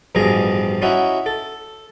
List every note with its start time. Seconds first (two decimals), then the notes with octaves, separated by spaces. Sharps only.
0.15 A1 G2 B2 F3 G#4 A#5
0.82 C#4 D#4 E4 F#4 E5 F#5
1.26 A4